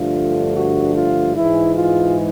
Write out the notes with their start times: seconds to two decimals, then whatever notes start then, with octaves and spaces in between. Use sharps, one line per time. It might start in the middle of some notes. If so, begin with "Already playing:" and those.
Already playing: G2 D3 F3 A3 F4
0.57 F#4
0.96 F4
1.35 G#2 E3 G#3 E4
1.75 F4